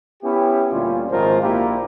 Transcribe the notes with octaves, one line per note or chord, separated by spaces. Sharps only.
B3 C#4 E4 G4
D2 A#2 G3 C#4 F4
G#1 F3 G#3 F4 A#4 C5
A#1 A#3 D4 E4 F4 G4